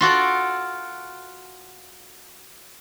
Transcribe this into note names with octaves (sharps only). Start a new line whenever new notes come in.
F4 F#4 A4 D5